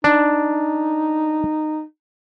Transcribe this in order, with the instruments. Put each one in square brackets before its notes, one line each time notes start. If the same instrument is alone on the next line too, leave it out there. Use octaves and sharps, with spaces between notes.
[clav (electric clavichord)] D4 [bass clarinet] D#4